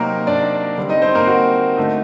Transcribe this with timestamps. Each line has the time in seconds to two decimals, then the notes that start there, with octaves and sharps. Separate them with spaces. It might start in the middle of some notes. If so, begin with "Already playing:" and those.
Already playing: C3 F#3 A#3 C4 D#4 A#4
0.27 D4 D5
0.78 D3 G3 C4
0.89 D#4 D#5
1.02 C4 C5
1.15 A#3 A#4
1.27 F#4
1.77 D3 A3 D#4